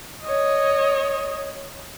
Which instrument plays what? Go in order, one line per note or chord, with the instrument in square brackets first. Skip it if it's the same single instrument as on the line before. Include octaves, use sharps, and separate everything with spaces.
[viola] C#5 D#5